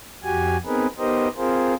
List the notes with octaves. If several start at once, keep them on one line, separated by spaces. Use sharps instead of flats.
F2 F#4 G4 G#5
B3 C4 D#4 G#4 A#4 B4
B3 D#4 G4 A#4 C5 D#5
C4 F4 G#4 A#4 C5